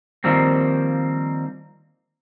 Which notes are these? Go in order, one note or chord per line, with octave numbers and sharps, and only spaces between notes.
D#3 F3 G3 A#3 C4